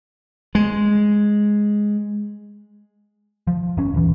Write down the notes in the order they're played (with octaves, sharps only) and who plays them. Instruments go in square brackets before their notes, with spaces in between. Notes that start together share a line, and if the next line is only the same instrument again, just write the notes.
[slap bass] G#3
[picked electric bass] F3
G1 C#4
D#1 E3